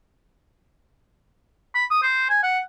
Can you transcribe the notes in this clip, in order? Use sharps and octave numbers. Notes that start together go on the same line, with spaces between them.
B5
D#6
C5
G#5
F#5